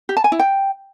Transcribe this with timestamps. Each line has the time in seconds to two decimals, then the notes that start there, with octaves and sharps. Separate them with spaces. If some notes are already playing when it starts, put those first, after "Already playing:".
0.09 G4
0.17 A5
0.24 G#5
0.32 E4
0.39 G5